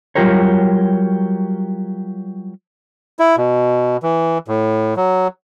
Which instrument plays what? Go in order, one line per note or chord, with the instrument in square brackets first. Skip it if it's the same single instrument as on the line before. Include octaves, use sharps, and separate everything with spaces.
[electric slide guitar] F#3 G3 F4 G4 A#4 C#5
[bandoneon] E4
B2
E3
A2
F#3